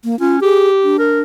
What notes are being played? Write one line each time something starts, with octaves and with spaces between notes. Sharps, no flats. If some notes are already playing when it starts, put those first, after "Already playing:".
A#3
C#4 F4
G4 G#4
D4
A#4